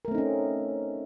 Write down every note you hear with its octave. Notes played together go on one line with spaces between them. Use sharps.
A3 C4 C#4 D#4 A#4